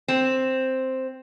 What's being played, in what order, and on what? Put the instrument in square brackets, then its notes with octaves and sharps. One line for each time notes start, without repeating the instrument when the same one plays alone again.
[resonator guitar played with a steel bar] C4